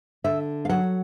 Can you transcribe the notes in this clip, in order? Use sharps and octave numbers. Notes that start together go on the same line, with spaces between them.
D3 E5
F5
F#3 F#5